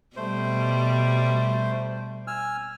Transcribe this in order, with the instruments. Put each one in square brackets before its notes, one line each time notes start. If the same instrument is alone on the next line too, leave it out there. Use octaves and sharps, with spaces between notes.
[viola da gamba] B2 G3 [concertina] A3 C5
[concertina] G#5 E6 F6